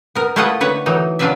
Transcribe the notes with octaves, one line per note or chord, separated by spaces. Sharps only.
B3 A#4
A3 E4 F4 B4 D#5 F#5
D3 B4 C#5 F#5
E3 F#3 D#4
F#3 D4 F4 B4 D5 E5